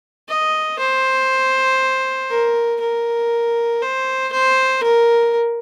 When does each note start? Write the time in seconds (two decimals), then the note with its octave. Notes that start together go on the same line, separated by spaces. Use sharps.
0.28 D#5
0.79 C5
2.30 A#4
2.81 A#4
3.82 C5
4.32 C5
4.83 A#4